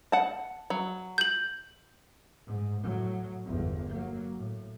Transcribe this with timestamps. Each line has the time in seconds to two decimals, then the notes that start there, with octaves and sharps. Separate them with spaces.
0.12 F#5 A5
0.70 F#3
1.18 G6 F#7
2.46 G#2
2.82 A2 F#3
3.45 G1 E2
3.90 F#3 A#3
4.36 A2